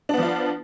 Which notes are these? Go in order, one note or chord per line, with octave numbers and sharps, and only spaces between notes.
F3 B3 D4 F4